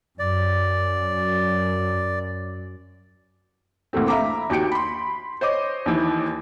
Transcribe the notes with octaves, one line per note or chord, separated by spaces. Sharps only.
F#2 D5
D2 A#2 E3 A3 C4
E5 F5 A#5 B5 D6
D#2 F#4 G4 G6 C#7 D7
B5 C6
C5 C#5 D#5 D6
D#2 E3